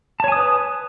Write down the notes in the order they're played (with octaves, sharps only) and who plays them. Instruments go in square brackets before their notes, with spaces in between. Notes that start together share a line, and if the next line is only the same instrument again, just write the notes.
[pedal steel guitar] A5
C#5
G#5
D#6
B4